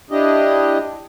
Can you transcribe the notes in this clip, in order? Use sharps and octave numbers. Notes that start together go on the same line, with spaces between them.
D4 E4 G4 D#5